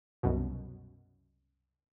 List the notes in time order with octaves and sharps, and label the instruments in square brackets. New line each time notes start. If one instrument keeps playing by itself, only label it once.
[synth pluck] C2 F#2 B2